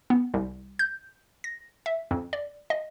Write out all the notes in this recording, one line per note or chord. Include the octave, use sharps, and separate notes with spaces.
B3
C2
G6
A#6
E5
F2
D5
D#5